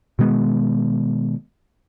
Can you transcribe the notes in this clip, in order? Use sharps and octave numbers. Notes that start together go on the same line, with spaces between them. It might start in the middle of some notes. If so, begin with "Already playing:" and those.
B2 D#3 G#3 B3